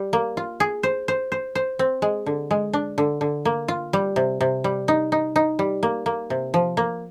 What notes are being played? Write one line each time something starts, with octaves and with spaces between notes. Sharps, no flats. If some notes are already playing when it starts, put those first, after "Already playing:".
Already playing: G3
A#3
F4
G#4
C5
C5
C5
C5
C4
G#3
D3
G#3
D4
D3
D3
A#3
F4
G3
C3
C3
G3
D#4
D#4
D#4
G3
A#3
A#3
C3
F3
A#3